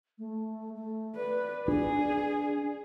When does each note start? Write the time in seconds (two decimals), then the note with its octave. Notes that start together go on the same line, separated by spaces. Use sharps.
0.18 A3
0.75 A3
1.16 B4 D5
1.68 D4 G#4